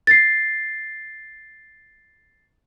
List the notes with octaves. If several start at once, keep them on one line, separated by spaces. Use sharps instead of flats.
A6 C7